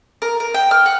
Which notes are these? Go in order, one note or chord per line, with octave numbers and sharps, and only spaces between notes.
A#4
A#4
G5
F6
F#5